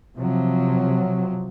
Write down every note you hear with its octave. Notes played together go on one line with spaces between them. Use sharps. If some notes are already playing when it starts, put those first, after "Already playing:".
C3 F3 F#3